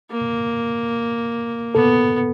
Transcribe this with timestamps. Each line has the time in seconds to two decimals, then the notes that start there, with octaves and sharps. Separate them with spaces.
0.11 A#3
1.74 B3 A4